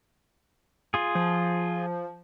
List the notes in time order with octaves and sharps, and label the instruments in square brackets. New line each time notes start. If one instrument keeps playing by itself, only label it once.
[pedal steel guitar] F4 G#4
[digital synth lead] F3